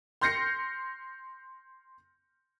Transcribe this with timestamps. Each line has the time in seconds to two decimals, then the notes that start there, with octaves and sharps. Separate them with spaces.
0.21 C6 F6 G6 A#6 C7 C#7